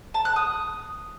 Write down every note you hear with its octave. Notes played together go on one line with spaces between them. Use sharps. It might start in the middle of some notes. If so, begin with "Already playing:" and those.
A5
F#6
D#6